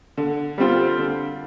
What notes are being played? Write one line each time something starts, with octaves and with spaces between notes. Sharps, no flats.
D3
G3 C4 F4
D3